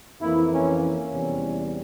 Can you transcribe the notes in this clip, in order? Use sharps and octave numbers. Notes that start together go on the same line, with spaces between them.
F2 E3 A#3 E4
C#4
C#4
E2 C3 G3